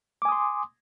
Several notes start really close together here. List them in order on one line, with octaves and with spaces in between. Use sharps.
D6 G#5 D#6 C6